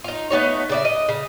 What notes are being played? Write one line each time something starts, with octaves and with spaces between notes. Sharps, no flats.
D#4 F4
A3 B3 D#4 C#5
C#3 D5 E5
D#5
C#3